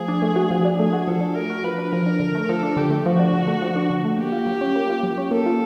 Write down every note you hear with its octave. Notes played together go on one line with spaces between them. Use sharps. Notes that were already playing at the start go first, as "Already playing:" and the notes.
Already playing: F3 A3 G#4
D4
A3
F#4
F3
D4
A3 G#4
F#4
F3 A4
D4
A3 A#4
F#4
F3 B4
D4
F3 A#4
D4
D3
A3
F3 A4
D4
D3 G4
A3
F3 F#4
D4
D3
A3
F3
D4
D3
A3
A#3 G4
F4
F#3
C#4
A#3
F4
F#3
C#4
A#3 A4
F4